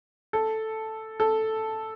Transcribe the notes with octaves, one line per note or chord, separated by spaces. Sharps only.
A4
A4